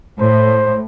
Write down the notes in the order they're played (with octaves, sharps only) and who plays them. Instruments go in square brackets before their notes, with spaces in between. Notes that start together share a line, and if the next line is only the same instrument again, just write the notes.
[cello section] A2 [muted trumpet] C5